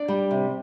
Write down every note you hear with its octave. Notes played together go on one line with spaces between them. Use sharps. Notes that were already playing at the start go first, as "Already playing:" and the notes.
Already playing: D4 D5
G3
C3